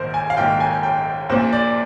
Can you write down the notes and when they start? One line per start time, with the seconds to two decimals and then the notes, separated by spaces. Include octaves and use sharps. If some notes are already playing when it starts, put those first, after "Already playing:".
Already playing: A#1 G#2 D#3 A#4 C5
0.14 G#5
0.30 F5
0.37 A#1 G#2 D#3 G5
0.60 G#5
0.83 G5
1.29 A#1 A#2 C5
1.53 D5